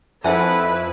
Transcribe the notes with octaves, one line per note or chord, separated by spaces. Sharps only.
F2 E4 A4 B4 C5 E5 F#5 G#5